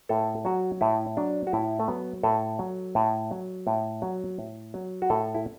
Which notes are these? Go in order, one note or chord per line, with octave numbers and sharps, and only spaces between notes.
A2 A4
F#3 F#4
A2 E4
F#3 D4
F#4
A2 E4
A3
F#3 B3
A2 A4
F#3
A2
F#3
A2
F#3
A2
F#3
F#4
A2 A4
E4